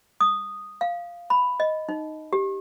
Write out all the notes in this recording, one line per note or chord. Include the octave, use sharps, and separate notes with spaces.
D#6
F5
B5
D#5
D#4
G4